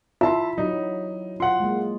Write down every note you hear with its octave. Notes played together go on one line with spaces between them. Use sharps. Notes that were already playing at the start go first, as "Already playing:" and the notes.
E4 F4 E5 A5 C6
F#3 D#4
F4 F#5 C6
G#3 A#3